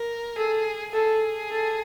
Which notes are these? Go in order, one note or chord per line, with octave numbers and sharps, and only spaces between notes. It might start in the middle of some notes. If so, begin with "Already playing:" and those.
Already playing: A#4
G#4 A4
G#4 A4
A4